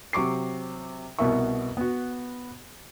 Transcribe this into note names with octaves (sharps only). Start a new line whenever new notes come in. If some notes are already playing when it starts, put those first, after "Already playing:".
C3 F#3 C#6 D6 C7
C2 B2 B3 A#4 E5 C#6
B3 F#4